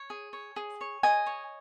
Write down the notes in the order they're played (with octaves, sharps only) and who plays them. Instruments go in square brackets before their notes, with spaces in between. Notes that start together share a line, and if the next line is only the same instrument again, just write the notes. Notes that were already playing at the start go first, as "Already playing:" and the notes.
Already playing: [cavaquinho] C#5
G#4
C#5
G#4
C#5
G#4 D#5 G#5
C#5